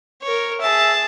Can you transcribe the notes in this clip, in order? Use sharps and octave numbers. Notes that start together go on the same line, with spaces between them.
A#4 C#5
G#4 E5 A5